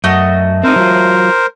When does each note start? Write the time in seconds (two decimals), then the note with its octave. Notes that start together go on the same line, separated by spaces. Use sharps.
0.04 F#2 A3 F#4 D#5
0.64 C4 D#4 A#4 C5
0.76 F#3 F4